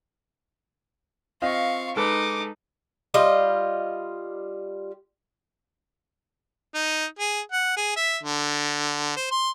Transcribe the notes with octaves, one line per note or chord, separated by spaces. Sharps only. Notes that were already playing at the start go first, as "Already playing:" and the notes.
C4 F4 D#5 F5 C#6
G#3 D#4 A4 B4 D6
G3 F4 D#5
D#4
G#4
F#5
G#4
E5
D3
C5
C6